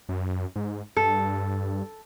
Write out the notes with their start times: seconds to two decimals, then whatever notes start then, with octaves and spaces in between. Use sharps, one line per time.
0.09 F#2
0.56 G#2
0.96 G2 A4